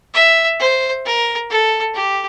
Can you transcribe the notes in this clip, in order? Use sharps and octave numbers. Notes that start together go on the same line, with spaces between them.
E5
C5
A#4
A4
G4